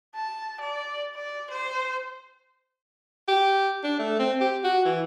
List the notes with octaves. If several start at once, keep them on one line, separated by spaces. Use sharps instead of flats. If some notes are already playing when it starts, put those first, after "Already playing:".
A5
D5
D5
C5
G4
D4
A3
C4
G4
F#4
E3